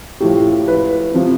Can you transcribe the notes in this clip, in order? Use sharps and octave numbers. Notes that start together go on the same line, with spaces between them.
A2 F3 G4
B4
C3 F3